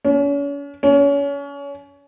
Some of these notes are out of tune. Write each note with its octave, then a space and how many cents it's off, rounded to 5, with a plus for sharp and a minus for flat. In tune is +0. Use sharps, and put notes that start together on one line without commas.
C#4 +40
C#4 +30